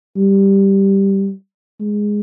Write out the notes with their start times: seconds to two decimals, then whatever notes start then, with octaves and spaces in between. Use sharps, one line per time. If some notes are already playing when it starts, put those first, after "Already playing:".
0.17 G3
1.80 G#3